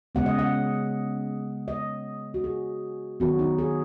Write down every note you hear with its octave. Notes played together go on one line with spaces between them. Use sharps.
C#3 G#3 B3 F#5
D#5
F#5
D#5
F#4
G#4
D#3 F#3 B3 F#4
D#4
G#4